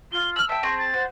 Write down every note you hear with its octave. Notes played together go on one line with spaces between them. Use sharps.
F4 G7
E6 F6 F#7
E5 G5 A5 E6
C4 G#4 C#6 A#6
A6
F#4 C5